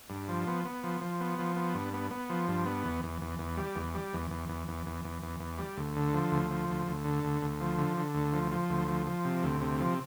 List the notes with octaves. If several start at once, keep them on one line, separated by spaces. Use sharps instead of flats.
G2
F3
B3
B3
F3
F3
B3
F3
B3
G2
B3
B3
F3
G2
B3
E2
E2
E2
E2
G3
E2
G3
E2
E2
E2
E2
E2
E2
E2
E2
G3
D2
D3
F3
D2
F3
D2
D2
D3
D2
D2
F3
D3
D3
D2
F3
F3
D2
F3
F3
C3
D2
C3
F3